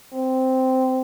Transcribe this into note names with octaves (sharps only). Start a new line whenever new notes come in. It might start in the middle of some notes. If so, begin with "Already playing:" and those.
C4